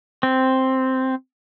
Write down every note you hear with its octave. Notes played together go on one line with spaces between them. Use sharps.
C4